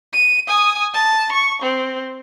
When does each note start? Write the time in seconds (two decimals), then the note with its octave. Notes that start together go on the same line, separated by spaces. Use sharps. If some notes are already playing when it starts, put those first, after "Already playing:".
0.13 D#7
0.48 G#5 D#6
0.94 A5
1.33 C#6
1.63 C4